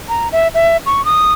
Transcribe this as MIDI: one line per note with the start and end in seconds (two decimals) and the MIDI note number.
0.09 0.28 82
0.32 0.48 76
0.55 0.77 76
0.86 1.04 85
1.05 1.33 87